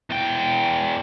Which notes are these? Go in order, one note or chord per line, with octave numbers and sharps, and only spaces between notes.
E2 G5